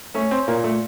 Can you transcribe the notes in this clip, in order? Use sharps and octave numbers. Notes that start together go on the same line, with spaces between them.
A3 C#4
C4
A#2 A#3
A3